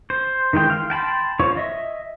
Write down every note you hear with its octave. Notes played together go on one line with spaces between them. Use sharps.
C5
D#3 E3 G#3 G5 C6
F5
G5 A5 B5 C6
F4 C5 C#5 F5 C#6
D#5 E5